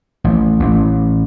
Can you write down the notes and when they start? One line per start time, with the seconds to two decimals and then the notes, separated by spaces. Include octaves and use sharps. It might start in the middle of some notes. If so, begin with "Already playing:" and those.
0.24 A1
0.60 A1